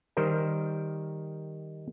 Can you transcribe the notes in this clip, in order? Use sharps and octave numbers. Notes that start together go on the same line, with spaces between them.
D#3 G3 A#4 C5